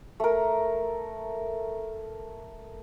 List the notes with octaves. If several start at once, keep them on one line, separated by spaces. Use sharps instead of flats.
A3 A#4